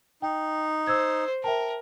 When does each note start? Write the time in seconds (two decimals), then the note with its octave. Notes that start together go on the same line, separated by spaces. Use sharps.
0.22 D#4 G5
0.87 C5 E6 G#6
1.44 A#4 E5 G5 A5